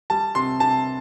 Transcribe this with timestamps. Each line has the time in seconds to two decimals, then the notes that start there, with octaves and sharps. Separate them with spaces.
0.10 G3 A5
0.35 C3 C6
0.60 C3 A5